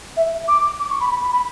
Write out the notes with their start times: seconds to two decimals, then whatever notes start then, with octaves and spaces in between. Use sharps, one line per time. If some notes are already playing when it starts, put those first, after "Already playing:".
0.17 E5
0.48 D6
0.80 D6
0.90 C#6
1.00 B5
1.11 B5
1.22 B5
1.32 B5